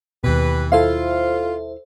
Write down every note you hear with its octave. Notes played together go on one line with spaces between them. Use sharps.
D#2 B2 E3 G4 B4
E4 F4 A4 C5 E5 F5